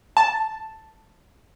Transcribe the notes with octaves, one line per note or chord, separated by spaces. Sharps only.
A5